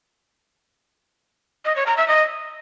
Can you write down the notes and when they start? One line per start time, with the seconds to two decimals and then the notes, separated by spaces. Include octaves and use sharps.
1.65 D#5
1.76 C#5
1.87 A#5
1.97 E5
2.08 D#5